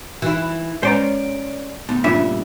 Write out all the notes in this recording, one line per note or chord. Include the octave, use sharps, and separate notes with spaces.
E3 D#4 E4 F#4
G#3 C#4 B4 C5 D5 A#5
D2 B3
G2 A#2 C#3 D4 F4 E5